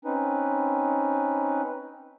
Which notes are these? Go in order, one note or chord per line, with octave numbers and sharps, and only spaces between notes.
C4 C#4 D#4 B4